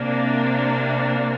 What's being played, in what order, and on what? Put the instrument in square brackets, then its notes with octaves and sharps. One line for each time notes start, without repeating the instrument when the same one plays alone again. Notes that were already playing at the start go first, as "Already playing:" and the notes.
Already playing: [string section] C3 A#3 D4